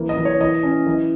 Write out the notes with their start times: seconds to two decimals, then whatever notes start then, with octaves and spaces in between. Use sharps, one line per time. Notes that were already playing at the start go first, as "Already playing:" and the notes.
Already playing: E3 A#3
0.09 D#5
0.18 E3
0.25 C#5
0.40 E3 D#5
0.63 C#4
0.87 E3